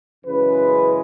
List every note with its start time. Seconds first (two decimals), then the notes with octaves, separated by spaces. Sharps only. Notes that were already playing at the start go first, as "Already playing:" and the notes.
0.25 F#2 C#3 E3 G#3 B4